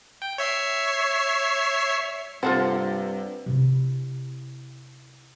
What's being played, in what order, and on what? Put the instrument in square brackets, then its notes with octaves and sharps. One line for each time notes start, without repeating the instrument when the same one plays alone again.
[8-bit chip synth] G5
C#5 E5 C7
[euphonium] G2 [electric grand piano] C3 [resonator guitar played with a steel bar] A#3 F#5 [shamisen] F4 A4 C5
[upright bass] C3 E4